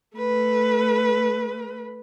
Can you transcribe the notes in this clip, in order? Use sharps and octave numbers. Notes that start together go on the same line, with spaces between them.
A3 B4